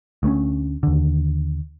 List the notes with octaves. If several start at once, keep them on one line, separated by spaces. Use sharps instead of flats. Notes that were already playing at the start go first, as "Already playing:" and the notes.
D2 A3 B3 C#4
D#2 D3